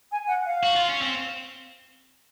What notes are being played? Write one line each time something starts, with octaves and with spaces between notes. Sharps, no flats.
G#5
F#5
F5
F#4
F4
C#4
C4